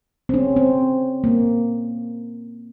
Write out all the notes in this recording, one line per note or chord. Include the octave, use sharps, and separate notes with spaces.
C4
C#4
C4
A#3